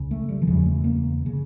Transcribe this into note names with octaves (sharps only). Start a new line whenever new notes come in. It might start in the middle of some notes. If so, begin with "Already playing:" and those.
Already playing: C#2 C#3
A3
G3
E3
E2 C#3 F3
A3
A#3
C#3